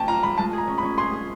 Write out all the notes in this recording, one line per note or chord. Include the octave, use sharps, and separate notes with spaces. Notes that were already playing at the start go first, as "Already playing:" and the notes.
Already playing: C#4 G5 A5
F4 A#5
G#3 B5
G#3 A5
G#4
A#5
C#4
B5
C#4
G#4 C6
G#4